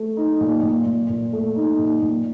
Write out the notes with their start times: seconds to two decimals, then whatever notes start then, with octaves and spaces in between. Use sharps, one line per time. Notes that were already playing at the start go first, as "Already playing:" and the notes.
Already playing: A3
0.17 D#4
0.41 A#2
0.63 A#2
0.86 A#2
1.10 A#2
1.33 A3
1.56 D#4
1.79 A#2
2.02 A#2